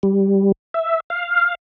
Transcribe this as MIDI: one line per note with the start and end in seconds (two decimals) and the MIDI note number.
0.03 0.52 55
0.74 1.00 76
1.10 1.55 77